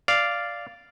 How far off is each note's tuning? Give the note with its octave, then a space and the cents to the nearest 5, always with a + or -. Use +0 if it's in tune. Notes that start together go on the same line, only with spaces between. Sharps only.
D5 -5 F5 -10